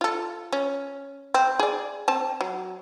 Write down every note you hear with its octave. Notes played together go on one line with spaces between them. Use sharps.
F4 A4
C#4
C4
G#4 D5
C4 A5
F#3